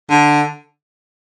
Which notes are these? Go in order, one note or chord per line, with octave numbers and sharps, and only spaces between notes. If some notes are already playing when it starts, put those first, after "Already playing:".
D3